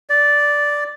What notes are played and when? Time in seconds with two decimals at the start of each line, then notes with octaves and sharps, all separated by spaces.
0.10 D5